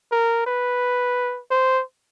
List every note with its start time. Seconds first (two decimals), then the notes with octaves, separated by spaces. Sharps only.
0.12 A#4
0.47 B4
1.51 C5